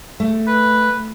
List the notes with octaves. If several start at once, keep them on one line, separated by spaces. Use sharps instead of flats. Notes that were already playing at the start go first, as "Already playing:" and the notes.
A3
B4